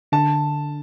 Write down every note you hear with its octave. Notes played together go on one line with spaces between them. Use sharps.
D3 A5